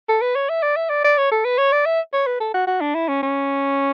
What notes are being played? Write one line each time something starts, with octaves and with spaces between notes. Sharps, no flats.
A4
B4
C#5
E5
D5
E5
D5
D5
C#5
A4
B4
C#5
D5
E5
C#5
B4
A4
F#4
F#4
D4
E4
C#4
C#4